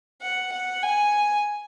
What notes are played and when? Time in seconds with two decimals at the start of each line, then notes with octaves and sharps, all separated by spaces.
0.21 F#5
0.52 F#5
0.82 G#5